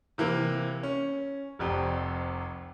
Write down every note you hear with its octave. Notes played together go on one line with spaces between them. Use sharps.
C3 E3 A#3
C#4
F1 C2 F2